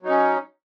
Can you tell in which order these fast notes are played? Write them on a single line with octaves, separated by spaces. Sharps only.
F#3 D#4 C#4